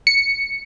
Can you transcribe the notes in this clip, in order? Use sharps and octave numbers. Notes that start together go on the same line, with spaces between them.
C#7